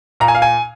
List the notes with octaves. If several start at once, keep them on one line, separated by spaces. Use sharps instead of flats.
A#2 A#5
G#5
F5
G#5